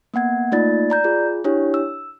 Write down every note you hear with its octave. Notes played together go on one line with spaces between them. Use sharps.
A#3 B3 F#5 G#6
A3 A#3 D#4 F4 D5 A6
D5 A#5 G6
F4 G#4
D4 E4 G4 C#5
E6